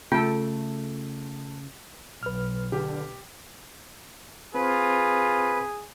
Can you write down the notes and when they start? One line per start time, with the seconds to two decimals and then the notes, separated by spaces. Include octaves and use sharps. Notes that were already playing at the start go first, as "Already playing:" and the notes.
0.12 C#3 A3 F4 A4 G5
2.23 B1 B4 F6
2.72 D3 G4
4.54 C4 F4 G#4 B4 C5